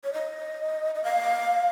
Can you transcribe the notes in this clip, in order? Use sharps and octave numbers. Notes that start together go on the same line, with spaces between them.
C#5
D#5
D#5
F5